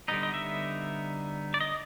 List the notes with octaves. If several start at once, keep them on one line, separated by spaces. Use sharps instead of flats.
D3 G3 B3 D#4 D#5
D#5
E5
D5
D#5